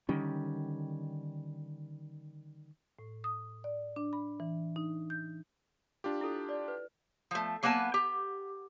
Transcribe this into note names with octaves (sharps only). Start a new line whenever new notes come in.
D3 D#3 G3 C#4
A2
D#6
D5
D4
B5
E3
D#4
G6
D4 F4 G4
E4 A4
D5
B4
F3 A3
F#3 A#3 B3 B4 G#5 A5
G4